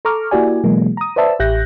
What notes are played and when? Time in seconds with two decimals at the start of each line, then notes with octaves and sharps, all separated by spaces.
0.05 A4 A#5 C#6 D6 F6
0.31 A#3 E4 F#4 G4 D5 G#5
0.64 B2 E3 F#3 G#3 A#3
0.97 A#5 D#6
1.16 B4 C5 D5 E5 A5 E6
1.39 A1 G4 E5 F#6 G6 A#6